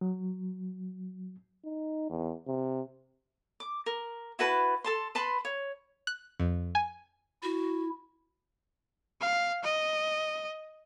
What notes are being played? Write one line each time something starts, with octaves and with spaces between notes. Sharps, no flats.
F#3
D#4
E2
C3
D6
A#4
E4 F#4 B4 A5
A4 A5 C6
B4 A5 B5 C6
C#5
F#6
F2
G#5
E4 F#4
F5
D#5